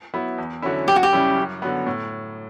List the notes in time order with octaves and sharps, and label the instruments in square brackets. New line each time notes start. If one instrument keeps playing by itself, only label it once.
[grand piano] F#3 B3 E4
E2
D3 F#3 C#4 E4
[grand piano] F#2 [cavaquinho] G4
[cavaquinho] F#4
G4
[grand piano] C#3 G3 C#4 E4
F#2
D3 F#3 B3
A2